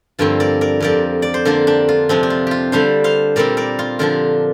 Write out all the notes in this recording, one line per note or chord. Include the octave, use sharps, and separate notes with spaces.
G2 D3 F3 C4 F4 A#4
A#4 D5
A#4 D5
F2 F3 C4 A#4 D5
D5
C5
D3 A#3 D4 F4 A#4
D4 G4
F4
C3 F3 C4 D4
D4
F4
F4 G4
D3 G3 D4 C5 F5
C5 F5
A#2 G3 C4 A#4 D5
A#4 D5
F4
D3 F3 D4 F4 A#4